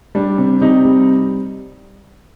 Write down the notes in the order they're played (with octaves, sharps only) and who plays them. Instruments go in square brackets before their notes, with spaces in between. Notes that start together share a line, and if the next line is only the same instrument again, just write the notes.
[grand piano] G3 D4
C3
C3 D#4
G3